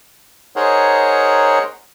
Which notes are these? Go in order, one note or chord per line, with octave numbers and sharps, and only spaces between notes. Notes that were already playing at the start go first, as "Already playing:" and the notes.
D#4 G#4 A#4 C5 C#5 F#5